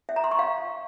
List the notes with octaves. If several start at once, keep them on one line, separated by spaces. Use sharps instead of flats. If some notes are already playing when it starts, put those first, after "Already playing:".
E5
A#5
C6
C#6
F5